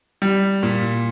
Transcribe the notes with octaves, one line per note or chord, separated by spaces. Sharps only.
G3
A#2